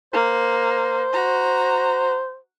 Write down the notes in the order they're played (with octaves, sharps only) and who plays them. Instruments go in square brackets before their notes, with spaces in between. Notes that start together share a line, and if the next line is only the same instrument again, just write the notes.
[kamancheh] A#3 [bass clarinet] C5
[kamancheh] F#4 A#5